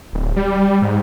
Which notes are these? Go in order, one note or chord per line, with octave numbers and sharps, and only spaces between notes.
D1
G3
G#2